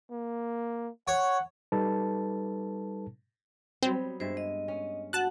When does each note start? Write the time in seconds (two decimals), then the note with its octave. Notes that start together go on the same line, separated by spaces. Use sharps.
0.11 A#3
1.08 C#5 F#5
1.72 G3 D#4 A4 B4 A5
3.83 F#3 G3 B3 C4
4.20 G2 G#3 C5 E5
4.37 D#5
4.68 C#4
5.13 F#4 F#5 A5 F#6